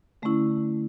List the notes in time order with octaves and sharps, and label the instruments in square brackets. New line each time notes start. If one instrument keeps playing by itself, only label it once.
[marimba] D3 A3 C#4 E4